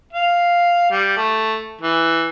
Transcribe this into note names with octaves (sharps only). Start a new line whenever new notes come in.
F5
G3
A3
E3